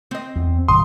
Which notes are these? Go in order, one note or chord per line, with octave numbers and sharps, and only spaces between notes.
C4 D#5
E2
G1 A#2 F#3 C6 D#6